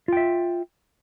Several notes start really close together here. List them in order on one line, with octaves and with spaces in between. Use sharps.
F4 G5 E5